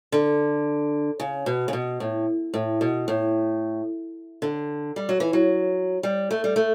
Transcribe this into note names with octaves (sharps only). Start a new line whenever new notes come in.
D3
C#3
B2
C#3
B2
A2
A2
B2
A2
D3
G3
F#3
E3
F#3
G3
A3
G3
A3